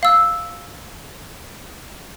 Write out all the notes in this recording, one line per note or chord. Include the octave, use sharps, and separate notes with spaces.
F5 E6